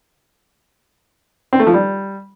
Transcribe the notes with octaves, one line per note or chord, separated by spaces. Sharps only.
C4
A3
F3
G3